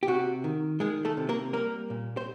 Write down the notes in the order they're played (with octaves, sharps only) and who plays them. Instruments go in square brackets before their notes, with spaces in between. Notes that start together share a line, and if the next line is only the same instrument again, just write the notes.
[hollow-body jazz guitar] G4
C3 F#4
D#3
D#3 G#3 G#4
A3 A4
C3
A#3 A#4
G3 A#3 A#4
A#2
C5